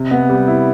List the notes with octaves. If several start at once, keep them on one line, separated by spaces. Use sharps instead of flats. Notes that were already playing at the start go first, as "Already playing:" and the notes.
Already playing: C3
B3
G3
E4